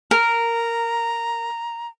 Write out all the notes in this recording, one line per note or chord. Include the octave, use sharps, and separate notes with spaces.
A#4 A#5